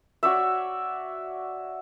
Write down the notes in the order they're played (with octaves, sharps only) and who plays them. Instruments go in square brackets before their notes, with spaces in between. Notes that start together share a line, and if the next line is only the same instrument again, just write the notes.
[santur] F#4 C#5 D5 E5